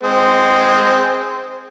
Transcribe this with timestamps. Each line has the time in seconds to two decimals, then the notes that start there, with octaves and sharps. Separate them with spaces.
0.03 G#3 C4